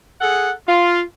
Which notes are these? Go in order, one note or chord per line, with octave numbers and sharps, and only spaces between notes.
G#4 A4 F#5
F4